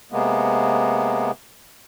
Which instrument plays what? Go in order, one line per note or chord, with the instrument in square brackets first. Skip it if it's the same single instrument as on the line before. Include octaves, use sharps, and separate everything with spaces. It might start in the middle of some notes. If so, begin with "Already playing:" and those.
[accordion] C3 G#3 A#3 B3